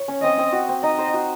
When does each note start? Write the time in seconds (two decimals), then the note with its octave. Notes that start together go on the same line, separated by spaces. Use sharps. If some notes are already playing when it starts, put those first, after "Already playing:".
Already playing: C#5
0.08 C#4
0.22 C4 D#5
0.38 C4
0.52 F#4
0.69 C4
0.83 D#4 D#5
0.99 C5
1.14 F#4